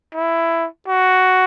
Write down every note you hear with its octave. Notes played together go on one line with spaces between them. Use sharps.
E4
F#4